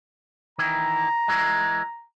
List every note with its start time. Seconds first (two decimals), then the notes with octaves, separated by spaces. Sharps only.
0.59 D#3 E3 E4 A#5
1.28 E3 G#3